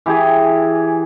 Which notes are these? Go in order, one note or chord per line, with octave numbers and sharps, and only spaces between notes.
E3 G4 G#4